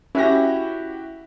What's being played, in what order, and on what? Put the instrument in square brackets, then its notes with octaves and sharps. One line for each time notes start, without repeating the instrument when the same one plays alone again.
[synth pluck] C#4 A#6 [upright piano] E4 F#4 G4